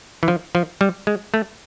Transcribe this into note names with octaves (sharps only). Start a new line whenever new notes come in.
E3
F3
F3
G3
G#3
A3